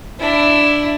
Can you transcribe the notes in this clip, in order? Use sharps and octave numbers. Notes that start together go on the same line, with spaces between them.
D4 E4